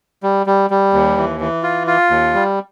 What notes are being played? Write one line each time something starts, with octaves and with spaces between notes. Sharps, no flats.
G3
G3
G3
D#2
E3
E3
F4
F4
D#2
G3